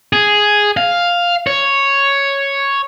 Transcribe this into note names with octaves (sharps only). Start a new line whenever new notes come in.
G#4
F5
C#5